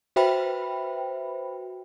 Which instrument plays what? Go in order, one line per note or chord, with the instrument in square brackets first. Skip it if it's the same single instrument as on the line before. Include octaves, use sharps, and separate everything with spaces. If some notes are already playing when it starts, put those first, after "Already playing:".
[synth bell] F#4 B4 C5 E5 G5 B5